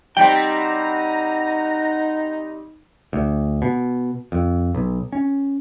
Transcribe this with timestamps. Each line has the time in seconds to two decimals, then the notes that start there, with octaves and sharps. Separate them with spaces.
0.17 G3 C4 D#4 F#5 G5 A#5
3.13 D2
3.62 B2
4.32 F2
4.75 B1
5.12 C#4